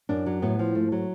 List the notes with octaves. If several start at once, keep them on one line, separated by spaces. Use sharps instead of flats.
F#2 D4
F#3
A2 B3
F3
G#2 A3
F#3